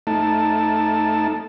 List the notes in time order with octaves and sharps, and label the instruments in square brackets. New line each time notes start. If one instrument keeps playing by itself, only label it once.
[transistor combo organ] A3 D#4 A5